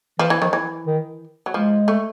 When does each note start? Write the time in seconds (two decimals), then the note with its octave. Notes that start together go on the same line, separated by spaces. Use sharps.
0.19 E3 F3
0.30 E3
0.42 D#3 F3
0.53 E3
0.87 D#3
1.46 F#3
1.54 F3 G#3
1.88 A3